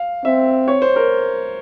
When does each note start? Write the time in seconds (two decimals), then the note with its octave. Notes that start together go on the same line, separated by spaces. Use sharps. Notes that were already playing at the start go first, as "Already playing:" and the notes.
Already playing: F5
0.24 C4 E5
0.68 C#5
0.82 C5
0.96 A#4